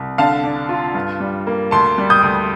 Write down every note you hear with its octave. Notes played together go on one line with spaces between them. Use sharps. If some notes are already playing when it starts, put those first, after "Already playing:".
Already playing: C2
D3 F5 A5
D4
F4
G2
G3
A#3
D2 A5 C6
G3
D#6 G6
D2